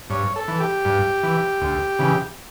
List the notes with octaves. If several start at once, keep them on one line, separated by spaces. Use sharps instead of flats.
G2 C#5
A4
E3
G4
G2
E3
D2
C#3 E3